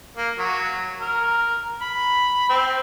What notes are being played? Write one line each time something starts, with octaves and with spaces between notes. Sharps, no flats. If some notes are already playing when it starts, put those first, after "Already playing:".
A#3
F#3
A#4
B5
C4